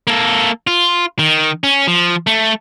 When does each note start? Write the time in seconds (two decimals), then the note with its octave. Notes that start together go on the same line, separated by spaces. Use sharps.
0.07 A#3 A4
0.67 F4
1.19 D#3
1.64 C#4
1.87 F3
2.27 A3